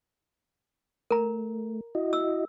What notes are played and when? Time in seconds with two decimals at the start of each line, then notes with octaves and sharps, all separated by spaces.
1.11 A3 A#4 A#5
1.95 E4 F#4 D#5
2.13 E6